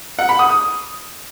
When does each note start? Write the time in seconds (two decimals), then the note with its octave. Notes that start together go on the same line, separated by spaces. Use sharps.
0.19 F#5
0.29 B5
0.39 D#6
0.50 D#6